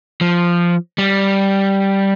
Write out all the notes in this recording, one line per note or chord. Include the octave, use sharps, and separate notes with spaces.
F3
G3